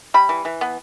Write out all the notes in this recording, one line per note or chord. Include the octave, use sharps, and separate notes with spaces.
G3 B5
E3
E3
B3